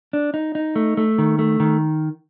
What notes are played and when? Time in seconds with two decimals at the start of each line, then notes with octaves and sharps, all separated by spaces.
0.13 D4
0.34 D#4
0.55 D#4
0.76 A3
0.97 A3
1.18 D#3
1.39 A3
1.60 D#3